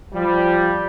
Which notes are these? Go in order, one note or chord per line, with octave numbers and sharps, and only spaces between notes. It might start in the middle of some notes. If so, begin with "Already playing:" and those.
F3 G3